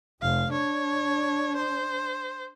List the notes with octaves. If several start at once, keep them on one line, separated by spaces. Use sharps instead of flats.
F1 F5
D4 C#5
C5